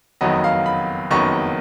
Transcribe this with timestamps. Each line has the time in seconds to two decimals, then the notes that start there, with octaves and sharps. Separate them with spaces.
0.21 F#1 F2 D#3 F#3 B3 D#5
0.44 F5
0.66 B5
1.11 F#1 F2 D#3 F#3 B3 C#6